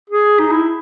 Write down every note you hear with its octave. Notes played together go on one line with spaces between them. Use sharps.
G#4
D#4
E4